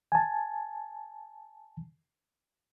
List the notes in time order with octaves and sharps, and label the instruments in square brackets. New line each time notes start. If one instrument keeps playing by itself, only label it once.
[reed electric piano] G#5 A5